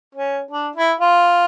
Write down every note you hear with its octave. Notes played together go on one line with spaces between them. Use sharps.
C#4
D4
E4
F4